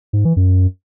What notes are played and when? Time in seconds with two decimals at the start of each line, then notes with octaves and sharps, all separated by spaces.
0.13 G#2
0.25 E3
0.36 F#2